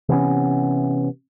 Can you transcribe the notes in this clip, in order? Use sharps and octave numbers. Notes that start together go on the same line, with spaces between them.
C3 E3 B3 C#4